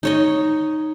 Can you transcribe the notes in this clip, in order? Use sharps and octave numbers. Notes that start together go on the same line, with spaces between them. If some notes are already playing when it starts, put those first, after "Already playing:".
D#4 C#5 D#5